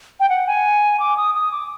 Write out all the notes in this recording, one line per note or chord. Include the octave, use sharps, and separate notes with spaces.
G5
F#5
G#5
D6
D#6
D#6
D6